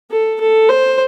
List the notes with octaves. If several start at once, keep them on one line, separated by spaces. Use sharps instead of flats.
A4
A4
C5